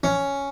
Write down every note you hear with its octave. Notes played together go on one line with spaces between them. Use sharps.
C#4